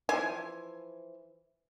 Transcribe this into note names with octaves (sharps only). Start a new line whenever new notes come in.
E3 F3 G#5